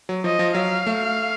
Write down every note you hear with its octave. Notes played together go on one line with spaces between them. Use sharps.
F#3
F3 D#5
F3
F#3 F5
A3